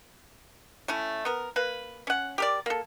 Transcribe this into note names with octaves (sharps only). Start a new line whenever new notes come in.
A3 C#4 E4
B3 A#4
A#3 B4
C#4 F#5
G4 A#4 D5
A#3 A4